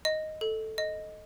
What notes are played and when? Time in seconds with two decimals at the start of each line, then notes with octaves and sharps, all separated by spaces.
0.05 D#5
0.41 A4
0.78 D#5